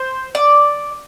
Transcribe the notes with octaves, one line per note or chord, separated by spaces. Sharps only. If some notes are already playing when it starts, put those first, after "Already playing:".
Already playing: C5
D5